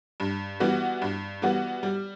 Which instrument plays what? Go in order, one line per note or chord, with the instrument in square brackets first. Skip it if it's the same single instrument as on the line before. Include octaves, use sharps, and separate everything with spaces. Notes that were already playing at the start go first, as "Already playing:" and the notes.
[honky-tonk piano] G2
E3 G3 B3 F#4
G2
E3 G3 B3 F#4
G3